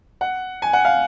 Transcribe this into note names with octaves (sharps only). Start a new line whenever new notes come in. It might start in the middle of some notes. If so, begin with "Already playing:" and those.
F#5
G#5
F#5
F5